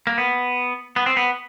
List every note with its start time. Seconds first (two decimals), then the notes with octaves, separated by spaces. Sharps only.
0.07 A#3
0.18 B3
0.96 B3
1.06 C4
1.17 B3